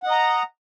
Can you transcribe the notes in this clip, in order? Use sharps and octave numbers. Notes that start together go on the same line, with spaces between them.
D#5 F#5 A#5